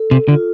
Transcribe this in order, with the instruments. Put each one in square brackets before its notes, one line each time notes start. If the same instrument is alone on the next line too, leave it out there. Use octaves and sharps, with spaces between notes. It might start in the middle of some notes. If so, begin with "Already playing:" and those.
Already playing: [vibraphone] A4
[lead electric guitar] C3
[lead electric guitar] D3 [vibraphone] F4